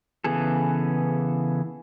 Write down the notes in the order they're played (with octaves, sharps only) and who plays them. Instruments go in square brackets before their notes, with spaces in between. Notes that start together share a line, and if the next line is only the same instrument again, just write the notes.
[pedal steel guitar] C#3 E3 B3 G#4 A4